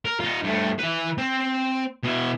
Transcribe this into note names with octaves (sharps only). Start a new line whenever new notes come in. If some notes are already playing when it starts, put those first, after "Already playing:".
A#4
D#4 F4
G2 A3
E3 B4
C4
B2 E4